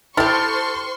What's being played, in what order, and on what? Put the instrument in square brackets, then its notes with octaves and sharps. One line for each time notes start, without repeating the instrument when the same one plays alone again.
[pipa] E4 G4 [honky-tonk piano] A4 F6 A6 [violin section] C5 C6 C#6